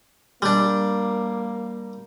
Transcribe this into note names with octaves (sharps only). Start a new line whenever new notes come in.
G3 A#3 D4